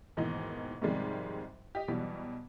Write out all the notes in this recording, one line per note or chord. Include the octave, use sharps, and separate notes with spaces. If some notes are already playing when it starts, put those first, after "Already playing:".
D#2 G#2 B2 E3 D#4
G#2 C3 D#3 F3 G3 G#3
G4 D#5
B2 E3 F#3 G3